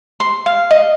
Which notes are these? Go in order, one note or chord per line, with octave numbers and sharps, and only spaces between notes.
C6
F5
D#5